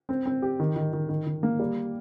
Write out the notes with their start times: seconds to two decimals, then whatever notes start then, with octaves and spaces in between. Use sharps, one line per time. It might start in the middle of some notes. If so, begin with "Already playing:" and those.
0.09 C4
0.26 C4
0.42 G4
0.60 D#3
0.76 D#3
0.93 D#3
1.09 D#3
1.27 D#3
1.43 A#3
1.59 G3